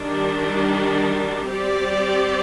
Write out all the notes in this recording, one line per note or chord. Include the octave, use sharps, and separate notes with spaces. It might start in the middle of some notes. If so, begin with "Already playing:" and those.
Already playing: D#3 G3 D4
G3 C4 G4 D5